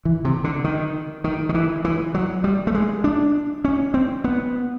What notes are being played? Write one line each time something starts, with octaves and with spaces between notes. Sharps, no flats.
E3
C3
D3
D#3
D#3
D#3
E3
E3
F#3
G3
A3
G#3
D4
C#4
C4
B3